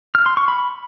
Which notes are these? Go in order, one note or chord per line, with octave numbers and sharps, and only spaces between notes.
F6
C6
C#6
B5